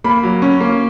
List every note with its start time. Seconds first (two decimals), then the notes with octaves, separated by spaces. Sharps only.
0.04 A#3 B5
0.23 F#3
0.42 C#4
0.60 A#3